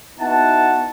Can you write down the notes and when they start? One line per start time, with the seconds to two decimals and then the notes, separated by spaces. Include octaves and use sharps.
0.19 B3 D#4 E4 F#4 F#5 A5